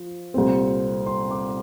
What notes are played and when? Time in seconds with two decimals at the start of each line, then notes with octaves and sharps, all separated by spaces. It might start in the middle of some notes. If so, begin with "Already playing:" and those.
Already playing: F3
0.34 C2 A#2 A3 C4
1.06 C6
1.31 D6